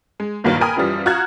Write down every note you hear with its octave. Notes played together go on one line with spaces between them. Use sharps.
G#3
E2 G2 A#2 D#3 F#3 A#3
A#4 G5 G#5 B5 D#6 F6
F#2 E3 F3 G3
F4 F#4 A#5 F6 F#6 G#6